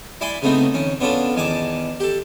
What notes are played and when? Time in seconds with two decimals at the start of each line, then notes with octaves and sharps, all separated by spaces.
0.21 E4 D5 G#5 B5 C6
0.42 C#3 A3 B3 C4 D#4
0.74 D#3 C#4
1.00 B3 C#4 D4 F4 A4
1.35 E2 D#3 G#5 A5 D6
2.00 G4 A4